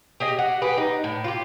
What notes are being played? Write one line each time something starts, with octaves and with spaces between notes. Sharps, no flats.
G4 G#4 D#5
F#4
G4 G#4 B4
D#4
A2
F4 G4